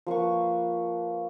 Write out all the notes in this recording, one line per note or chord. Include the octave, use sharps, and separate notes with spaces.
F3 A#3 B4 C#6